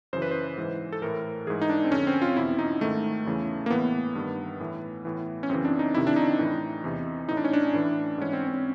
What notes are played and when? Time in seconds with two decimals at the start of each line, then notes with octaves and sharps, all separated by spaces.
0.13 F#2 C#3 E3 C5
0.22 B4
0.31 C5
0.57 G#2 E3
0.93 A4
1.02 A2 E3 A#4
1.47 G#2 E3 G#4
1.62 D#4
1.70 D4
1.84 C4
1.92 F2 D3 C#4
2.07 C4
2.22 F4
2.36 E2 B2 E4
2.59 D#4
2.81 G#2 D#3 A3
3.26 E2 C#3 E3
3.66 A#3
3.70 A2 E3 B3
4.15 G2 D#3
4.60 A2 E3
5.05 A2 E3
5.43 C#4
5.49 F#2 C#3 E3 C4
5.65 D4
5.79 D#4
5.94 F2 C3 D#3 E4
6.07 D4
6.16 D#4
6.39 A2 E3
6.84 E2 C3 E3
7.28 A2 E3 D#4
7.37 D4
7.44 C#4
7.53 D4
7.73 A2 E3
8.18 G#2 E3 C#4
8.33 C4
8.48 C#4